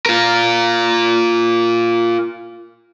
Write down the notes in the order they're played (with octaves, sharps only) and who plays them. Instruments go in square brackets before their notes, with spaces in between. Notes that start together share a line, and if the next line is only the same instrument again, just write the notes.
[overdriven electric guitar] F4 A#4